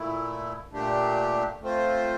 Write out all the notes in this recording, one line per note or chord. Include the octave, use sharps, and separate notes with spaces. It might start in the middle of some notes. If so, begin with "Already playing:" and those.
Already playing: A#2 A3 E4
A#2 A3 D4 G4
A3 C4 F4 C5